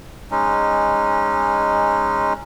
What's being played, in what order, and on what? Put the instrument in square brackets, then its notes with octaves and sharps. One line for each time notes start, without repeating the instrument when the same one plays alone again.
[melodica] G#3 C#4 D#4